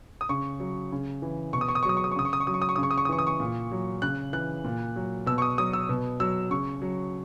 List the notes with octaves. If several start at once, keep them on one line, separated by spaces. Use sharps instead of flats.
D#6
C#3 C#6
F#3
C#3
E3
B2 C#6
D#6
C#6
D#6
C#6
F#3 D#6
C#6
D#6
C#6
C#3 D#6
C#6
D#6
C#6
F#3 D#6
C#6
D#6
C#6
C#3 D#6
C#6
D#6
C#6
D#6
E3 C#6
D#6
C#6
A#2
F#3
C#3 F#6
E3 F#6
A#2
F#3
B2 E6
C#6
D#6
F#3 D#6
E6
B2
F#3 E6
C#3 C#6
F#3